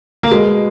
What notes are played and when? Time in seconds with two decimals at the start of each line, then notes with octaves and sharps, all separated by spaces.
0.23 A#3
0.31 B2 G#3